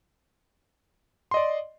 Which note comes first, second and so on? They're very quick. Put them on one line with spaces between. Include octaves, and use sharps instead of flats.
C6 D#5 D5